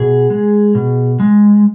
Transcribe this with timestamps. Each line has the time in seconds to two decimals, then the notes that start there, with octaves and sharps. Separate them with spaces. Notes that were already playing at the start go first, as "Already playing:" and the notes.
Already playing: B2 G#4
0.30 G#3
0.75 B2
1.20 G#3